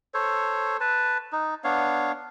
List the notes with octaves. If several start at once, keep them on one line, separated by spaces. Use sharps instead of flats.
A4 C5 C#5
B4 A5
D#4
B3 D4 C#5 F5